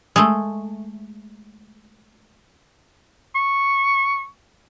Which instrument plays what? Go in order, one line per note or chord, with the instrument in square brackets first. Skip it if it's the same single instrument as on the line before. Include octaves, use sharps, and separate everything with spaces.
[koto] G#3 A3
[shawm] C#6